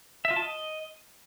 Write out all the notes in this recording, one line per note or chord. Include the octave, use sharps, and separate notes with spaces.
E5
F4
A5
D#5